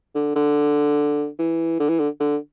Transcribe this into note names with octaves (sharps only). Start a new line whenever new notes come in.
D3
D3
E3
D3
E3
D3
D3